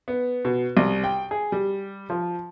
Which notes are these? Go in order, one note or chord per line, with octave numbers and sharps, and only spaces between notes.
B3
B2
C2
G5
G#4
G3
F3